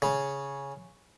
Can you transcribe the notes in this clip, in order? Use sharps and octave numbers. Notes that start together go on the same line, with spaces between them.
C#3